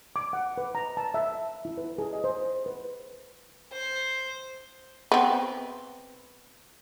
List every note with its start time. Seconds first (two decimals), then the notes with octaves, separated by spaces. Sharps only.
0.16 D6
0.33 F#5
0.58 B4
0.75 A#5
0.97 A5
1.14 E5
1.65 E4
1.78 B4
1.98 G#4
2.13 D#5
2.24 C5
2.66 B4
3.73 C5
5.12 B3 C4